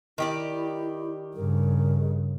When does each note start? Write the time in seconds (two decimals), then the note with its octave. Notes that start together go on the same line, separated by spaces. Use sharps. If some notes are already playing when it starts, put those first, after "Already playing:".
0.18 D#3 E4 G4 D5
1.36 G2 C#3 A#4